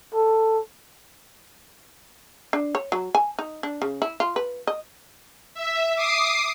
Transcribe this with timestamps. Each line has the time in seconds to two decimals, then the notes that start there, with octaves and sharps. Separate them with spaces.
0.14 A4
2.53 D4
2.75 C#5
2.92 F#3
3.15 G#5
3.39 D#4
3.63 D4
3.82 C#3
4.02 E4
4.20 F4
4.36 B4
4.67 D#5
5.54 E5
5.96 D6 D#6 C7